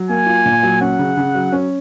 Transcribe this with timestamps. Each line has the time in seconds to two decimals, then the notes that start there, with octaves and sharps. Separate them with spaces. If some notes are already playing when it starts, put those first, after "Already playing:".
Already playing: F#3
0.09 A#3 G#5
0.26 F4
0.45 A#2
0.63 F#3
0.81 C#4 F#5
0.99 C#3
1.17 C#3
1.35 F#3
1.52 C#4